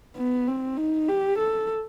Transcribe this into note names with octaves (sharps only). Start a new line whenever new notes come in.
B3
C4
D#4
G4
A4